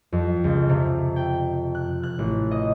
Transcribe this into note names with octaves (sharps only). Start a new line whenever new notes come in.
F2
C#2
C3
G5
F#6
F#6
A1
D#5